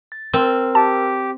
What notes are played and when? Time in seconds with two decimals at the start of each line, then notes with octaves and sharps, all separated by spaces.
0.12 A6
0.33 C4 A#4 E6
0.75 G4 A5